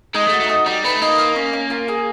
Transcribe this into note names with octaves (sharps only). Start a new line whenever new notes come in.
G#3 D#4
A3
F#4
A3
D#4
G3 D#4
A3 B4
A#3 D#4
F4
C#4
C#4
F4
G#4